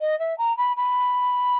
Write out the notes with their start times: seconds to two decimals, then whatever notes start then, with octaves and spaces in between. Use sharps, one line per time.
0.01 D#5
0.19 E5
0.38 A#5
0.57 B5
0.76 B5